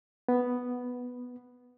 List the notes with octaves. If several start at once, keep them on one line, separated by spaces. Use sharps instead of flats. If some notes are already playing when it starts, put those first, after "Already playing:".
B3